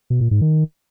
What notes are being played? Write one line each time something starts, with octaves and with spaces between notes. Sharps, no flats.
B2
A#2
G#2
D#3